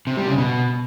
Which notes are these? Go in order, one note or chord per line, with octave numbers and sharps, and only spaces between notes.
C3
G3
C#3
B2